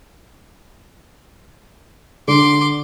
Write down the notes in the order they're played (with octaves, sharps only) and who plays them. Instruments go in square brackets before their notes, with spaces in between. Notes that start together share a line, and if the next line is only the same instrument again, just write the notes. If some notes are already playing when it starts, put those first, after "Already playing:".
[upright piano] D3 [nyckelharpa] C6 D6